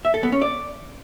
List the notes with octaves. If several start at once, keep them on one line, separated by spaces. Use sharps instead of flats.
E5
A4
B3
C#4
D5